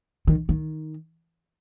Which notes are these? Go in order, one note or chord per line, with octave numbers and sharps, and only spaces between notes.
D#3
D#3